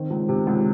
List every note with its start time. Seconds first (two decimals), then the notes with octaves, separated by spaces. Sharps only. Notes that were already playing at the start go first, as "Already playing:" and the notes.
Already playing: D#3 C4
0.10 C#2
0.29 C3
0.47 C#2